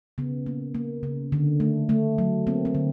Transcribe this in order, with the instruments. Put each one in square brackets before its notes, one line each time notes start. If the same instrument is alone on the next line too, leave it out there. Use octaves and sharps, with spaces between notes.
[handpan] C#3 B3
A#3
A#3
C#3
D3
A3
A3
F#3
A#3 C4
C4
D3